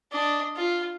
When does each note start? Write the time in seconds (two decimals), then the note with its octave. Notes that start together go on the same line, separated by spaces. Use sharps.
0.11 D4 D#5
0.56 F4